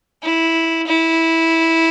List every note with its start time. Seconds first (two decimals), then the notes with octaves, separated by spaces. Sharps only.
0.23 E4
0.87 E4